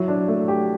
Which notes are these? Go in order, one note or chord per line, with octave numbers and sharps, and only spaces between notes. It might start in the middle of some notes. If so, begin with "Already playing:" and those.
Already playing: F#3 E4
D4
A3
G4